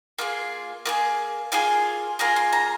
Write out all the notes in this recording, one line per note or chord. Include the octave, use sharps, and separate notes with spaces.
A#3 F4 G#4
A#3 F4 G#4
A#3 F4 G#4 G#5
A#3 F4 G#4 A#5
C6
A#5